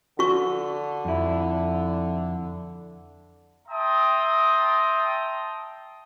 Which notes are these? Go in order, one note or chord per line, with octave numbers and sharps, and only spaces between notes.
D3 F#4 C#6
F2 E4
E5 G5 A5 A#5 C6 D#6